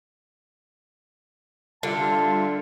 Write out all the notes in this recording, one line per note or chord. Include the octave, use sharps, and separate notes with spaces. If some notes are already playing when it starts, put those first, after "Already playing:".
D3 G3 F4 E5 A5